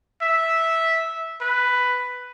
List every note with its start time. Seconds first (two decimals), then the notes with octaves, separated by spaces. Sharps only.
0.22 E5
1.41 B4